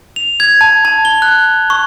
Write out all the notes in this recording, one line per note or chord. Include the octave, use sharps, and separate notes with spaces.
F7
G#6
A5
A5
G7
F#6
C#6